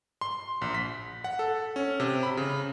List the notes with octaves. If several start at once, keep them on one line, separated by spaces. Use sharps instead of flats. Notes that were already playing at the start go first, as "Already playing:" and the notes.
C6
A#1
B6
F#5
A4
C#4
C3
B5
C#3